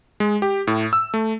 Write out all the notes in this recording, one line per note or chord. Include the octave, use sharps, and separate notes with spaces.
G#3
G4
A2
E6
A3